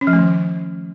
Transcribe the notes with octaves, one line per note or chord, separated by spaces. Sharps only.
C#4
F3
A3
D#3